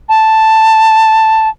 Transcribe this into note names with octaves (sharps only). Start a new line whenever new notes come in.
A5